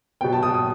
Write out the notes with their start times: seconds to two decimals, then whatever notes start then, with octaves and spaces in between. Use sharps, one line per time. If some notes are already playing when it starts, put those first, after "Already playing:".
0.21 B2 F#3 B3 G5
0.33 A5
0.43 D#6
0.54 D#6